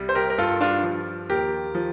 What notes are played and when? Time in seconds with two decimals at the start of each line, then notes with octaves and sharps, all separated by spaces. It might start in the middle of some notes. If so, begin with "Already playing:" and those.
Already playing: C2 G3
0.09 C5
0.15 G4 A#4
0.30 A#4
0.38 G2 F4 A4
0.61 D4 F4
0.84 F3
1.29 D#2 G4 A#4
1.75 F3